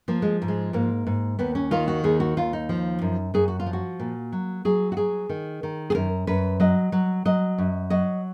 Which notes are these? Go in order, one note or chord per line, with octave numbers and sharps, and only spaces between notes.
F3 A#3
G#3
G#2
G#3
G#2 A#3
G#2
D#2 B3
C#4
D#3 F4
F#4
D#2 G#4
F#4
D#2 F4
D#4
F3
F#2
F#2 G#4
F#4
F4
F3
F#4
A#2
F#3
F#3 G#4
F#4
F#3 G#4
D#3
D#3
G#4
F#2 A#4
F#2 B4
F#3 D#5
F#3
F#3 D#5
F#2
F#3 D#5